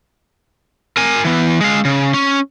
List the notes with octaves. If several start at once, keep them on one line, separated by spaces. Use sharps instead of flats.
A#4 G#5
E3 B3
G#3 F5
C#3
C#4